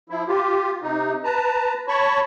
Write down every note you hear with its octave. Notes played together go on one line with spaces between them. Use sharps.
F3 E4
F4 G4
C3 D#4
B4 A5 A#5
C#5 A5 B5 C#6